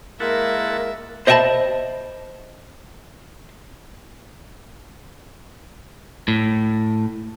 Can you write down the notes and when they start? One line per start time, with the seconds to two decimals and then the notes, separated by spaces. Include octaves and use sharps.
0.20 G#3 A#3 E4 A#4 E5 F#5 A5
1.27 C5 D#5 E5 G5 A5 B5
6.28 A2